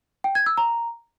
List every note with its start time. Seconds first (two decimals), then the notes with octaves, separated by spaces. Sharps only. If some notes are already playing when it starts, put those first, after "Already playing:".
0.24 G5
0.35 G#6
0.46 E6
0.57 A#5